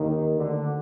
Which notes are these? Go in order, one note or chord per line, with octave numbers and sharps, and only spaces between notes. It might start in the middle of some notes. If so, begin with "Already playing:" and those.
Already playing: D#2 D#3
D2 D3